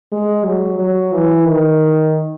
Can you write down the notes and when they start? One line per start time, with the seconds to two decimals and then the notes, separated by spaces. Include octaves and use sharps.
0.12 G#3
0.45 F#3
0.79 F#3
1.13 E3
1.47 D#3